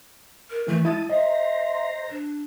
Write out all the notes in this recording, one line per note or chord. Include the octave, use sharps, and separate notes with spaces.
A#4
E3 A3
G#3 E4 A5 D#6
C5 D#5 E5 A#5
D4